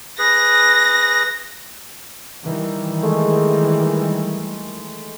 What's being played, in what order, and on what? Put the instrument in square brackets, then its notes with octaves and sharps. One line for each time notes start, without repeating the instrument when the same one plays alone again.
[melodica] G#4 B4 [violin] A#6
[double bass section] D#3 E3 G3
[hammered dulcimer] G#3 A3